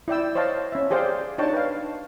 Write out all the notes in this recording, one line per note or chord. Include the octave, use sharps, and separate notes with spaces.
E4 D5 G5 E6
C5 C#5 D#5 F5 A5
C#4 E5
G4 G#4 C5 D5 F5 G5
D4 D#4 C#5 G5 A5
B4 F5